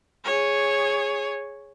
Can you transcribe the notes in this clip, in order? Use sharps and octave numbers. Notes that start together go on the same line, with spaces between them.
G#4 C#5